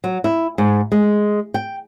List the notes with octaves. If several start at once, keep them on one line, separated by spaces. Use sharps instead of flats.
F#3
E4
G#2
G#3
G5